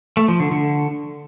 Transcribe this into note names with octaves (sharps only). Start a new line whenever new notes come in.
A3
F3
D3
D3